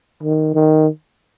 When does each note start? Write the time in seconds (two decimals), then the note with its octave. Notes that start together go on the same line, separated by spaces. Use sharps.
0.23 D#3
0.54 D#3